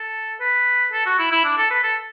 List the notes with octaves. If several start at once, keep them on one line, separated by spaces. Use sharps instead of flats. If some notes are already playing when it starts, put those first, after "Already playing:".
Already playing: A4
B4
A4
F#4
E4
E4
D4
A4
B4
A4